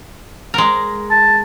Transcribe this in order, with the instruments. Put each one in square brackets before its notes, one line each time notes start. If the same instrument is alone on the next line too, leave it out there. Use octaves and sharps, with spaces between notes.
[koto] G#3 A#4
[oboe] A5